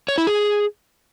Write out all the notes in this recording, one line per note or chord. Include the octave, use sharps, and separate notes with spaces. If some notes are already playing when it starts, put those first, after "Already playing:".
C#5
E4
G#4